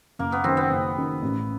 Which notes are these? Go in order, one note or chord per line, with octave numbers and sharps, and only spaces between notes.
F#1 A#3
B3
F#2 D#3 C4
B3
F#1
F#2 D#3
A1